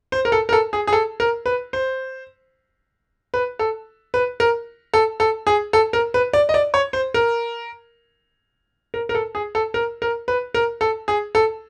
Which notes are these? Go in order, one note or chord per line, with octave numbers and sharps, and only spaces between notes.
C5
A#4
A4
A#4
A4
G#4
G#4
A4
A#4
B4
C5
B4
A4
B4
A#4
A4
A4
G#4
A4
A#4
B4
D5
D#5
D5
C#5
C5
A#4
A#4
A#4
A4
G#4
A4
A#4
A#4
B4
A#4
A4
G#4
A4